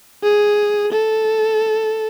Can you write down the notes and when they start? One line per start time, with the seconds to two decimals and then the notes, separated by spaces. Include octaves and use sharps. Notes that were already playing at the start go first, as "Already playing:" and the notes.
0.23 G#4
0.92 A4